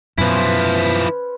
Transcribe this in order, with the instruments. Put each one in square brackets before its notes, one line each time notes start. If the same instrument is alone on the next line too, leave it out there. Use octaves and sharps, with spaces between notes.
[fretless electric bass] F#2 B2 [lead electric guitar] F3 E4 [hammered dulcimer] C#4 B4 C5